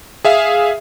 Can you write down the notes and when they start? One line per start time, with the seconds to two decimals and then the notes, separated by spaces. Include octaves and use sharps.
0.25 G#4 E5 F5